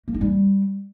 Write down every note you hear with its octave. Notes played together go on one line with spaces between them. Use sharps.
A#3
D#4
G3